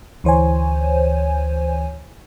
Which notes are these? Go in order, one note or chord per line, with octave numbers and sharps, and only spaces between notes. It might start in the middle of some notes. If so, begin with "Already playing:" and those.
D2 E3 C5 C#5 G#5